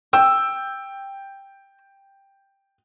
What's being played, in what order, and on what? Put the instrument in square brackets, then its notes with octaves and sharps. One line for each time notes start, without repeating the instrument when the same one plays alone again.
[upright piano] G5 [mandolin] E6